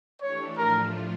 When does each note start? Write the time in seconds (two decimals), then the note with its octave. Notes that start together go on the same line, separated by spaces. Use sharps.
0.20 E3 A3 D4 G4 C#5
0.57 A2 F3 A3 D4 F4 A#4